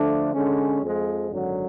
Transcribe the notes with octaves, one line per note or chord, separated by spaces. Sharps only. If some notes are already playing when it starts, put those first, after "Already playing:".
Already playing: D3 F3 A3 D4
D3 G#3 C#4
F2 F3 G#3
G#1 F#2 D3 F#3